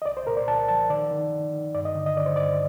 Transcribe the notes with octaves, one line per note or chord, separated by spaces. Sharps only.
D#5
C2 D5
C5
A#2 A#4
D5
C2 A5
F3 A5
D#3 D5
D#3
D#3
D#3
G2 D5
D#5
D3
D#5
D3 D5
C5
G2 D5